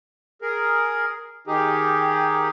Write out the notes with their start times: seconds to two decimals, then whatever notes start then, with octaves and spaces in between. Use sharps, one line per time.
0.42 G#4 A#4
1.47 D#3 D#4 G4 G#4